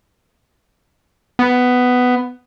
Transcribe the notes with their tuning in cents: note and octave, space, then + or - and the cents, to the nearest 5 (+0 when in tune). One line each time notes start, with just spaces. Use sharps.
B3 +10